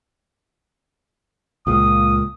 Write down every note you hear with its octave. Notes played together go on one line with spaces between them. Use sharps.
C#2 A#2 D#6